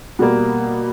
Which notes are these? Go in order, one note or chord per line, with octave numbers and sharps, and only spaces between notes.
B2 G3 A#3